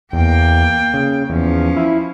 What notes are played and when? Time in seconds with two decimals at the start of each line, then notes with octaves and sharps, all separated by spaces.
0.13 E2 A#3 G5
0.94 C#3
1.30 E2 F3 C#4
1.76 E4